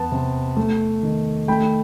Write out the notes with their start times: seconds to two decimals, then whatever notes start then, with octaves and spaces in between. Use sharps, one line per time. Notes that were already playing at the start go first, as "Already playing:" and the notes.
Already playing: E2 B3 A5
0.12 C3
0.57 A3
1.03 D#3
1.48 A3 G5 B5